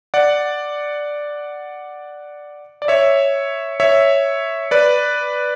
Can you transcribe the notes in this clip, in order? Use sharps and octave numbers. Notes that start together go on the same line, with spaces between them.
D5 F#5
D5
C#5 E5
C#5 E5
B4 D5